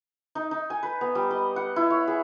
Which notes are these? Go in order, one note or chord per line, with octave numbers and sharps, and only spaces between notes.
D#4
D#4
G#5
B4
B3
G3
D#5
F#5
E4
C#5
G#4